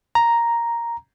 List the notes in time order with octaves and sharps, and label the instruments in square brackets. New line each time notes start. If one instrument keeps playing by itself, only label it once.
[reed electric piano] A#5